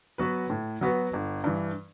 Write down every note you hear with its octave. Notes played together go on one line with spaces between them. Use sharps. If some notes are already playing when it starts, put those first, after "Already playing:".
F#3 B3 F#4 B4
A2
F#3 B3 F#4 B4
G1
G2 E3